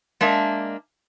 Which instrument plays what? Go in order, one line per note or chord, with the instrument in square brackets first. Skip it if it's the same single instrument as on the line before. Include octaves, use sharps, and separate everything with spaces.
[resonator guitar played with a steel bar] G#3 A#3 D4 E5